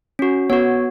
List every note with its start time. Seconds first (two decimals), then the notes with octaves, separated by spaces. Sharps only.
0.19 C#4 F#4
0.50 B3 F#4 C#5